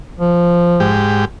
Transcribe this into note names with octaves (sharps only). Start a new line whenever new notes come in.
F3
G#2 G4